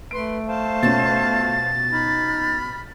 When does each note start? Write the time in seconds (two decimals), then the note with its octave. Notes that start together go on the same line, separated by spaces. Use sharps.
0.11 A3 B4 C6 D7
0.46 C5 F5 A5
0.83 B2 C#4 F4 A6
1.91 D#4 B5 F6